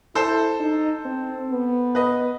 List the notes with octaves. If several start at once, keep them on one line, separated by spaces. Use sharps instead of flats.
E4 A4 C5
D#4
C4
B3
B4 D#5